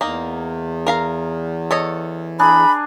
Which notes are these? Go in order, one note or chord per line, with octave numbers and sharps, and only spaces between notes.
E2 A#3 D#4
A#4 F5 A#5
A4 C#5 D#5
D4 G#4 A#5 B5